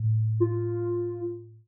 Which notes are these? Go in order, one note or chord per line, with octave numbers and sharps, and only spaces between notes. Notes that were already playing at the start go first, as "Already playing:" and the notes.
Already playing: A2
F4